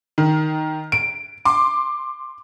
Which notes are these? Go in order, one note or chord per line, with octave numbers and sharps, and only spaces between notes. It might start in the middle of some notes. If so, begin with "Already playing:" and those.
D#3
D7
C6 D6